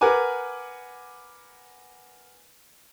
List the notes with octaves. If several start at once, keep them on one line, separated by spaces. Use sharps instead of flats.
A#4 B4 F#5 G#5 D6